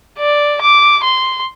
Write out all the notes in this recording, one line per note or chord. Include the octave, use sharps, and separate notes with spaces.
D5
D6
C6